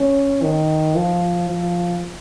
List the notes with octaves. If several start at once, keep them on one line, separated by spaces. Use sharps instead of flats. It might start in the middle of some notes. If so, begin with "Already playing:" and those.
Already playing: C#4
D#3
F3
F3